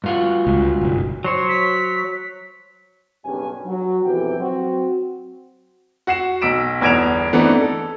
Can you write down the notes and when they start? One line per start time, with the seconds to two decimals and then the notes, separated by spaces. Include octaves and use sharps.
0.04 G2 F4 F#4
0.47 C#2
0.81 F#1 B1
1.24 F#3 C5 C#5
1.49 B6
3.25 F#1 B1 G2 G3 C#4 G#5
3.65 F#3
4.04 B1 F2 E3 E4 G4 G5
4.38 F#3 C4 F#4
6.07 F#4 F#5 C7 E7
6.41 B1 E6 B6 D7 E7
6.81 G1 E2 G#6 D7 E7 F7
7.33 E3 A3 B3 C4 D4 D#4
7.61 A4